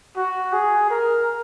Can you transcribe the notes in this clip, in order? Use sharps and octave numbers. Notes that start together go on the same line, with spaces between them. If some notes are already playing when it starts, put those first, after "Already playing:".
F#4
G#4
A#4